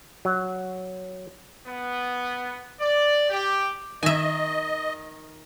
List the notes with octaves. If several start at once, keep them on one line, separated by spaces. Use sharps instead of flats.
F#3
B3
D5
G4
D#3 D#5 E5 G#5